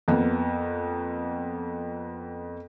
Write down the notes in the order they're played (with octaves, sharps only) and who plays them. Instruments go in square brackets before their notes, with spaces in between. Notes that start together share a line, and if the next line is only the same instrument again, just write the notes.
[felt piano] F2 A#3 B3